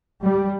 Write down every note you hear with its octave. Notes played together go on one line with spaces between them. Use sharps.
G3